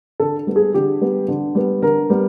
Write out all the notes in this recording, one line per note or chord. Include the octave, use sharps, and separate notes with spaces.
D3 A4
G3 B3
G#4
D3 G4
G3 B3
D3
G3 B3
D3 A#4
G3 B3